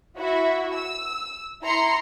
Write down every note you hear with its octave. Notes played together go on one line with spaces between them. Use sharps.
E4 F#4 E5
E6
E4 A#5 C6 C7 C#7